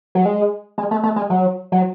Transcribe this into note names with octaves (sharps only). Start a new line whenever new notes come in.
F#3
G#3
G#3
A3
A3
G#3
F#3
F#3